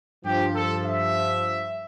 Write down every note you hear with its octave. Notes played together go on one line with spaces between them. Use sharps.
G2 F3 G4
A4
E5